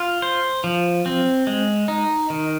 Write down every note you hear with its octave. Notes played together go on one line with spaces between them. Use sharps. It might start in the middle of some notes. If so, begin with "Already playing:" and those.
Already playing: F4
C5
F3
C4
G#3
D#4
D#3